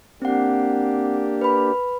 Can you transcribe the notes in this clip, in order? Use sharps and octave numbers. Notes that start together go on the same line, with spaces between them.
A#3 C4 D4 G4 F#5
B4 B5